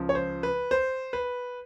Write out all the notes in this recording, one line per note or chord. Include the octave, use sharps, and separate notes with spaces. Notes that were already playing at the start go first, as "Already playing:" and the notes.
Already playing: C#2 C#3 F3
C#5
C5
B4
C5
B4